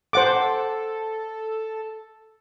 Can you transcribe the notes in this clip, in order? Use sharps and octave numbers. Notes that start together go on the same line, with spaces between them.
A4 C5 F#5 D6